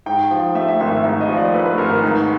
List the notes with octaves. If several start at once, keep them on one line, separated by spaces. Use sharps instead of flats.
G#2 G5
F3
A3 E5
E5
G#1 E5
E5
G#2
D#5
F3
D5
A3 B4
B4
G#1 A#4
B4
G#2